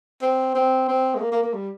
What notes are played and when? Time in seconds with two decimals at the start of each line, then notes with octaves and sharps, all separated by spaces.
0.22 C4
0.55 C4
0.88 C4
1.15 G#3
1.20 A#3
1.32 A#3
1.43 A#3
1.53 G3